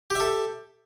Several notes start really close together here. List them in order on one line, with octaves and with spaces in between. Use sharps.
G4 E5 A4